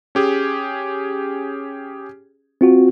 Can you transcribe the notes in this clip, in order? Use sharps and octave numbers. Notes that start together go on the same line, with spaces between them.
C#4 G4 G#4
C4 F4 F#4